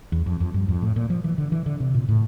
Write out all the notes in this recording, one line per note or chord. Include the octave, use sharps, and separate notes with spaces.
E2
F2
F2
G2
F2
A2
A#2
F3
E3
D3
E3
D3
C3
A#2
A2